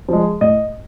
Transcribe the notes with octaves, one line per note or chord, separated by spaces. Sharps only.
F3 G#3
A2 D#5